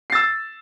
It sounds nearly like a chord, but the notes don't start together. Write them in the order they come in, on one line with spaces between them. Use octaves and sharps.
C7 A6 E6